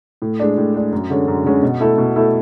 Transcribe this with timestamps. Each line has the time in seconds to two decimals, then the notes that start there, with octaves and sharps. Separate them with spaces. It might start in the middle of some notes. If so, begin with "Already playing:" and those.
0.22 A2
0.40 G#3 D4
0.58 A2
0.74 G#3 D4
0.92 F#2
1.10 D3 G#3 C#4
1.28 F#2
1.44 D3 G#3 C#4
1.62 B2
1.79 A3 E4 A4
1.98 B2
2.15 A3 E4 A4